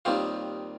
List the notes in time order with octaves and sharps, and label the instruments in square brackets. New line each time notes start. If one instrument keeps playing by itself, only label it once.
[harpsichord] D#2 D#3 G3 C4 F4